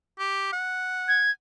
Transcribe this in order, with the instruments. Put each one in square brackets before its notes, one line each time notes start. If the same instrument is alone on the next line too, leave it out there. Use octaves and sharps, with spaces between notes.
[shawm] G4
F#5
[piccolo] G#6